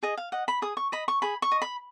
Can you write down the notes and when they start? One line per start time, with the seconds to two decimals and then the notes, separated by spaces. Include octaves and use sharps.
0.03 G#4 D#5
0.17 F5
0.32 D#5 F#5
0.48 B5
0.62 G#4 D#6
0.77 C#6
0.92 D#5 B5
1.08 C#6
1.22 G#4 B5
1.42 C#6
1.52 D#5
1.62 B5